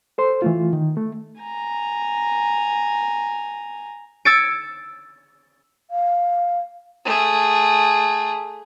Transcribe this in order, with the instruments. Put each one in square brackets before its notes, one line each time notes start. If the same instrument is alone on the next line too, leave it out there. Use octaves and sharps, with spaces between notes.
[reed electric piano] A4 C5 C6
E3 A3 F4
D#3
A3
[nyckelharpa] G#5 A#5
[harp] E6 G#6 A6 C#7 D7
[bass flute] F5
[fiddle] A3 G#4